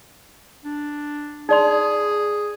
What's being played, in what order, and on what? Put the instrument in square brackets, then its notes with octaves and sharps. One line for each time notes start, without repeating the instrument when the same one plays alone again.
[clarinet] D4
[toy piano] D#4 D5 C6 [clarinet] G#4